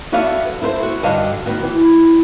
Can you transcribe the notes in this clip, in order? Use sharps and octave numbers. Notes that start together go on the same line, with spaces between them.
B3 F#4 A4 D5 E5 F5
E4 A4 B4 C5
F#4
G2 D3 F#4 D#5 F5 A5
D#3 B3 F#4
E3